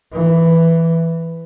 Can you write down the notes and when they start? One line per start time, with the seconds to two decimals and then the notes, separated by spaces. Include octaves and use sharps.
0.12 E3